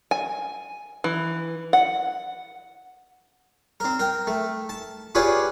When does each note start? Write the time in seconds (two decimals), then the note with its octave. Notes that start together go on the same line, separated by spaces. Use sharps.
0.11 G#5
1.04 E3
1.73 F#5
3.80 C4 A#4
3.99 A#4 G5
4.27 A3
4.69 A5
5.15 F4 G4 G#4 B4 C#5 D5